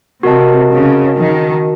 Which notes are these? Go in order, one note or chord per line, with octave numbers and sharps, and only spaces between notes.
C3 F#4 A#4 D#5 A5
C#3
D#3